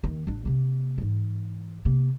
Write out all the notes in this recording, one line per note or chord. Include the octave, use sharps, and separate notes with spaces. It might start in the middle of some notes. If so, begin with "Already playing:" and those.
D#2 D#3
A1 D4
C3 A#3
G#2 E3
C3 A#3